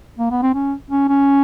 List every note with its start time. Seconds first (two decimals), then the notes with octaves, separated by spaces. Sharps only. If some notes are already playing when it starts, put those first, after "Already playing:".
0.19 A#3
0.31 B3
0.42 C4
0.54 C#4
0.90 C#4
1.08 C#4